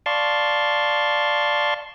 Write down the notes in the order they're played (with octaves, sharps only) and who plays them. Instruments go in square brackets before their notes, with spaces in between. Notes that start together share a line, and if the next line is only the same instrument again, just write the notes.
[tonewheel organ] D5 F5 A5 C6 C#6